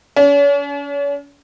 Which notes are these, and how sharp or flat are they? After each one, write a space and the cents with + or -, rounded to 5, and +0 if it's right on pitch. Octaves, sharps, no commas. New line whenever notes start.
C#4 +40